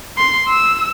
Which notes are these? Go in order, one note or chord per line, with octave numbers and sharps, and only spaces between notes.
C6
E6